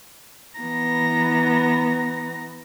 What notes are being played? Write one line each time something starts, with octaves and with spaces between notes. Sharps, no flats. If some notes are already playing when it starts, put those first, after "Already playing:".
E3 B3 A#5 A#6